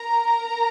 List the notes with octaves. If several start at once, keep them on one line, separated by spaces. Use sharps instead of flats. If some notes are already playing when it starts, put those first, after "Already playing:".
Already playing: A#4 A#5